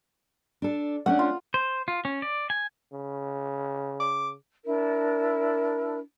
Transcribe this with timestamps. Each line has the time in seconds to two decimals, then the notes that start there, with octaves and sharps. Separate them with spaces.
0.62 D4 A4
1.06 A3 C#4 D4 F#5
1.19 F4
1.54 C5
1.88 F4
2.05 C#4
2.22 D5
2.50 G#5
2.93 C#3
4.00 D6
4.64 D4 E4 A#4